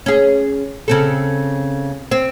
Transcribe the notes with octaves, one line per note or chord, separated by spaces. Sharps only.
C#4 G#4
C#3 C4 A4
C4